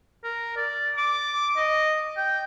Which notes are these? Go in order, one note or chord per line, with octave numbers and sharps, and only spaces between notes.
A#4
D5
D6
D#5
G5